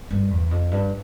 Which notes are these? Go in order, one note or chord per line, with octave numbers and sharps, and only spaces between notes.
G2
E2
F2
G2